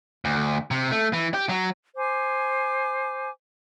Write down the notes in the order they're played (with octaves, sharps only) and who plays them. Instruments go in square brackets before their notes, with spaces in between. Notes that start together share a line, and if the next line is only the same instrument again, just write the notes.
[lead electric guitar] D2
C3
A3
E3
G4
F#3
[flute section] C5 G#5 D6